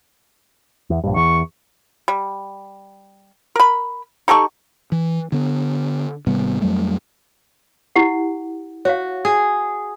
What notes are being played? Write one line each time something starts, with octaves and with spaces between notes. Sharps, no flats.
E2
A#1 G2
E2 C#6
G3
A#4 B5
D#4 G4 A4 C#6
E3
D3 B3
G#1 C3 G3 B3
F2 F#3 G3 A3
E4 G4 F#5
F#4 C#5 F5
G#4